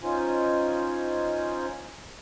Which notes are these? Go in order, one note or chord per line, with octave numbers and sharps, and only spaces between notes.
C#4 D#4 F4 C5 G#5